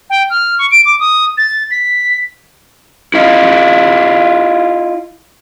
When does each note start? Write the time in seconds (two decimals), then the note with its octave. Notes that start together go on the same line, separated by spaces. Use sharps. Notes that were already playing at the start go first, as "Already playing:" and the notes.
0.10 G5
0.30 F6
0.59 C#6
0.71 D7
0.85 D6
1.00 D#6
1.38 A6
1.71 B6
3.14 E4 F4 D#5